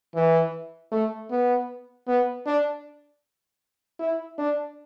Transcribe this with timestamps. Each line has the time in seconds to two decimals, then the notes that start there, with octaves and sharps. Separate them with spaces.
0.15 E3
0.92 A3
1.31 B3
2.07 B3
2.46 D4
3.99 E4
4.38 D4